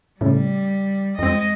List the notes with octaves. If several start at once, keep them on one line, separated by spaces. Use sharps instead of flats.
A2 C#3 G3
F2 G#3 C4 D#5